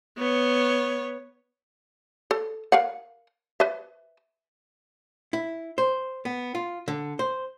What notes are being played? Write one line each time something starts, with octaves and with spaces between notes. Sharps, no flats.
B3 C#5
A4
A#4 F5 F#5
B4 E5
E4
C5
B3
F4
D3
C5